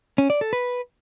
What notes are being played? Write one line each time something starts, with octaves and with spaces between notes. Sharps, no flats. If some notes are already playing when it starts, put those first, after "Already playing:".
C#4
D5
A4
B4